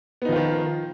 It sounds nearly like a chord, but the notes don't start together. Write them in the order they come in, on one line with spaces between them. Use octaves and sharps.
B3 D#4 F3 F4 D#3